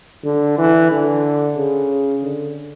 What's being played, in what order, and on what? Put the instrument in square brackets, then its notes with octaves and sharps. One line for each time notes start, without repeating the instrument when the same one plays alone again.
[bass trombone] D3
E3
D3
C#3
D3